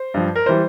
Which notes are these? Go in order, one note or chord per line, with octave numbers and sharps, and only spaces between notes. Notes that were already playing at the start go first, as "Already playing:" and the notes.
Already playing: C5
G2 F3
A#4
E3 G3 C5